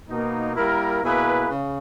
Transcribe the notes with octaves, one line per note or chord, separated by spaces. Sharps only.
B2 A#3 D#4
G3 A#3 E4 A#4
B2 A#3 E4 G#4 B4
C#3